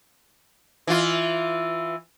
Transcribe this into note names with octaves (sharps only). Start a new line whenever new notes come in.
E3 F4